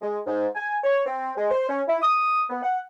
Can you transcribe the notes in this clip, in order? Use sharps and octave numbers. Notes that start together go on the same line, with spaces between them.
G#3
G#2
G#5
C#5
C4
G#3
C5
C#4
E4
D#6
B3
F#5